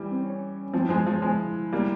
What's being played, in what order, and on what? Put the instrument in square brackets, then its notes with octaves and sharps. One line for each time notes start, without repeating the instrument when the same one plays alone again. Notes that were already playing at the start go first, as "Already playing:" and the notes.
Already playing: [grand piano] E3 G3
[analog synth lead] C4
C#4
[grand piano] F3 [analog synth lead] C4
[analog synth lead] E4
[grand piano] F3 G#3 [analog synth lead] C#4
[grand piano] F3 [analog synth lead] C#4
[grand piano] F3 G#3 [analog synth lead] E4
[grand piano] G3 A#3